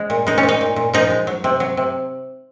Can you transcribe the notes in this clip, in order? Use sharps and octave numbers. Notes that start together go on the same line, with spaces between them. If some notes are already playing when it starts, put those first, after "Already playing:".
Already playing: G#3
A#2
G#3 D#4
C#4
A#2
D#4
A#2
A#2
F3 D#4
G#3
F#3
C3
F#3
C3